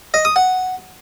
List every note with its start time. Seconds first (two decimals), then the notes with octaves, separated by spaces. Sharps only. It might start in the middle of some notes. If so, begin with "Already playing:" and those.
0.14 D#5
0.25 D#6
0.36 F#5